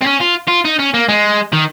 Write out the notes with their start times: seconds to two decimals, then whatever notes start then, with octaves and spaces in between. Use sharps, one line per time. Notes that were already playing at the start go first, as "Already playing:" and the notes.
0.02 C4
0.06 C#4
0.21 F4
0.48 F4
0.65 D#4
0.79 C#4
0.94 A#3
1.09 G#3
1.53 D#3